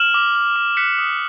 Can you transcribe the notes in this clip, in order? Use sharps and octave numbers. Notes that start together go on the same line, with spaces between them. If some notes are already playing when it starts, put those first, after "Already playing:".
Already playing: F6 E7 F#7
D6
F6
D6
F#6 B6 C#7
D#6